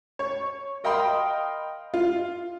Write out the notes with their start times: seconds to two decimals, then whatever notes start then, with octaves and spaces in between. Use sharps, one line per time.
0.19 C#5
0.84 A#4 D#5 F5 G5 B5 C6
1.94 F4